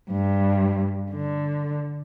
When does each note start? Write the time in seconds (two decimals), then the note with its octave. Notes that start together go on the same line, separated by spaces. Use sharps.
0.10 G2
1.11 D3